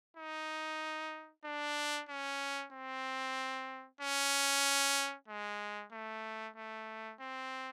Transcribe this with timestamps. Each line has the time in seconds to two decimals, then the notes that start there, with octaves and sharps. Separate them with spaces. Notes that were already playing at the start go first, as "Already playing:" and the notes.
0.17 D#4
1.45 D4
2.09 C#4
2.72 C4
4.01 C#4
5.28 G#3
5.92 A3
6.56 A3
7.20 C4